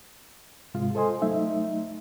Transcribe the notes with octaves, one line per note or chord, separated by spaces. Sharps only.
G#2 C3 G#3 F4
A4 C5 D#5 G#5 C6
F#3 A3 D#4 E5